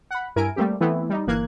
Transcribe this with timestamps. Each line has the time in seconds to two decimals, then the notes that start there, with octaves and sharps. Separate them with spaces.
0.11 F#5 B5
0.36 G2 E4 A#4 G#5 D7
0.56 G3 A3 A#3 C4 G4
0.80 E3 A3 B3 C4 E4
1.10 G3 D#4
1.27 G1 E3 A#3 F#6 G#6